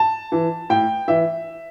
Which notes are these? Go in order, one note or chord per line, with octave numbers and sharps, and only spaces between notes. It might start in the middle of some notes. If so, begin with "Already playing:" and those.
Already playing: A5
E3
A2 G5
E3 E5